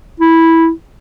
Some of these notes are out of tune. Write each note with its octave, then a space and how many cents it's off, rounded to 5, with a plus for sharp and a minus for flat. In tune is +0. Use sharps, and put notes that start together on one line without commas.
E4 -10